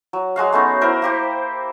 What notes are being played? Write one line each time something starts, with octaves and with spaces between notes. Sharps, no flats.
F#3
F#3 G#3 F#4 F5
A3 B3 C#4 D#4
E4 A#4 C5
A#3 G4 C5